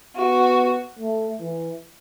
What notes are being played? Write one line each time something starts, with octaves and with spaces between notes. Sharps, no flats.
B3 F#4
A3
E3